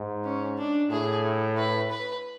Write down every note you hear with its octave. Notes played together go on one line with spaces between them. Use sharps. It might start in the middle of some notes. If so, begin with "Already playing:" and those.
Already playing: G#2
C#4
D4
A2 G#4
B4
B4